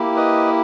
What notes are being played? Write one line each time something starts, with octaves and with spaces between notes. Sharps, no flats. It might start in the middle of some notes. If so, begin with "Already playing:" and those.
Already playing: A#3 E4 G4
B4 D#5